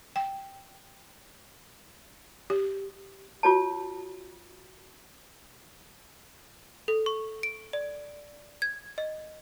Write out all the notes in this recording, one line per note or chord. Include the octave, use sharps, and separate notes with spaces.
G5
G4
F4 F#4 C#5 A5
A4
C#6
D7
D5
G#6
D#5